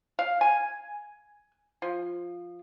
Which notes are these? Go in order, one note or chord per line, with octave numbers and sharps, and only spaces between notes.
F5
G#5
F3